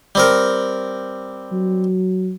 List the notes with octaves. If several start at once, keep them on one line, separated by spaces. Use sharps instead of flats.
G3 C4 A#4
F#3